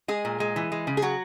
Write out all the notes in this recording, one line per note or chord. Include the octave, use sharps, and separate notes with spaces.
G#3 G#4
A#2
G#3
E3
G#3
C#3
G#4
F#3 F#4